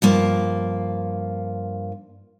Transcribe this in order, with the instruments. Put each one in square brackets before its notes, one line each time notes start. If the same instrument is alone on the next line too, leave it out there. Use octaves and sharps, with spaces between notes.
[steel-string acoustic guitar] G2 F3 A#3